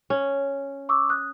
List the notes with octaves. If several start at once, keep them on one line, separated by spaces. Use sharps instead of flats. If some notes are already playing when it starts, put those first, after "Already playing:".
C#4
C#6 D6 E6
D#6 F#6